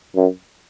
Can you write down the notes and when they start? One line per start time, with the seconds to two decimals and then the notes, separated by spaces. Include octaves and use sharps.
0.16 F#2